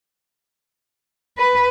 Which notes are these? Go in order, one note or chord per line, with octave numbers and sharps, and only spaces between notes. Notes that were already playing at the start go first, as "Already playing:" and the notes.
B4